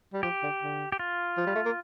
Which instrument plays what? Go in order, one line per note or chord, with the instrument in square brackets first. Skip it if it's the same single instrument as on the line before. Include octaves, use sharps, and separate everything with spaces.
[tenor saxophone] G3
[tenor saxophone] F3 [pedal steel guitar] G4
[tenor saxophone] D3
D3
[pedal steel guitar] G4
F4
[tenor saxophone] F3
G3
A3
A#3